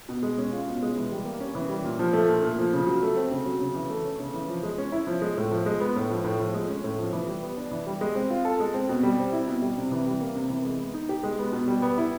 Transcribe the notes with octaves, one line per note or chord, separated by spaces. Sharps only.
B2
G#3
C#4
F4
B2
G#3
E3
G3
A#3
C#4
E3
G3
A#2
F3
A3
A#2
A#2
F3
C#3
F#3
A3
C4
C#3
F#3
C#3
E3
A3
C#4
C#3
E3
F3
G#3
C#4
E4
F3
G#3
A2
F3
G#3
B3
A2
F3
A2
F3
G#3
C#4
A2
F3
E3
G3
B3
D4
E3
G3
G#3
C4
F4
A4
G#3
C4
B2
G3
C4
E4
B2
G3
C3
E3
G3
A#3
C3
E3
G#3
B3
D#4
G4
G#3
B3
B2
G3
B3
E4